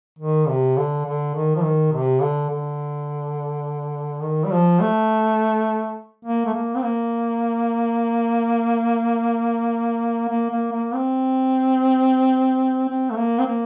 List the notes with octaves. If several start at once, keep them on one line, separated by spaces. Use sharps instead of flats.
D#3
C3
D3
D3
D#3
F3
D#3
C3
D3
D3
D#3
G3
F3
A3
A#3
A3
A#3
C4
A#3
A#3
A#3
A#3
C4
C4
A3
A#3
C4
A#3